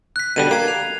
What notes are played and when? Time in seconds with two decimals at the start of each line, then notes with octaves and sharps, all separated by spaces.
0.16 F#6 B6
0.36 B2 D3 G3 D#7
0.51 A#3 G#6 C7
0.68 F7